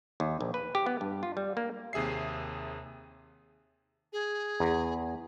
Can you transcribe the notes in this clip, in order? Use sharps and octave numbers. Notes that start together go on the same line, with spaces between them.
D#2
A#1
B4
G4
B3
G2
F4
G3
A#3
D#2 C3 G#4 E5 C7
G#4
E2